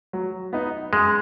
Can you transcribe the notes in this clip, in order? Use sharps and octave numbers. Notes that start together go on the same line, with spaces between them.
F#3
B3 D#4
F#2 G#3